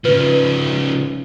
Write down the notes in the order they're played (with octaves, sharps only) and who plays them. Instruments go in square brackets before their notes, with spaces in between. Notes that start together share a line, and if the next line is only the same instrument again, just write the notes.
[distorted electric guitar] C#3 F3 [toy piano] B4